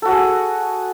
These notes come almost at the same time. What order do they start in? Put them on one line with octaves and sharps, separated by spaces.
A4 F#4 F#5 G#4